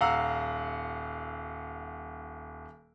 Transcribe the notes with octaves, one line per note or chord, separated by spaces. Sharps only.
D#1 F5 F#5 A#5 E6